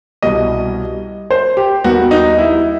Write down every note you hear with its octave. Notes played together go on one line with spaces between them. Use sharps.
C2 B2 G3 D#5
C5
G4
D#2 D#3 G3 B3 F#4
D#4
E4